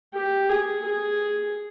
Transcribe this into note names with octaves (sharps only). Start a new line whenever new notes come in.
G4
G#4
G#4